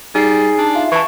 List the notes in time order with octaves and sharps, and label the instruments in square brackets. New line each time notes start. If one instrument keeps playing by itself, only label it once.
[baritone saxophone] G3 [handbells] D#4 C7 [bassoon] G#4
[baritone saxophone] D4 [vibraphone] G#5 A5
[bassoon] F4 [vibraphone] E5
[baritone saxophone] E3 [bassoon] E4 [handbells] A5 C#6